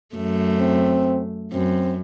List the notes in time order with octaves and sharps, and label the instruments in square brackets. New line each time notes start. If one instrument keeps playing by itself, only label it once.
[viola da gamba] F#2 A3
[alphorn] C4
[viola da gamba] F#2 [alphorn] C4